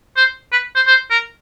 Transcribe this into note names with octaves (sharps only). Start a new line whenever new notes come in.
C5
B4
C5
C5
A#4